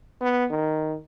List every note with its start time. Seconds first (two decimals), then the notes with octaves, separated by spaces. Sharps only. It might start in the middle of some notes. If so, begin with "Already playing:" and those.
0.21 B3
0.50 D#3